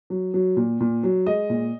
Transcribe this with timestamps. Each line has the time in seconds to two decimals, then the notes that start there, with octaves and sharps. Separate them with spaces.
0.10 F#3
0.34 F#3
0.57 A#2
0.80 A#2
1.03 F#3
1.26 G#3 D#5
1.50 A#2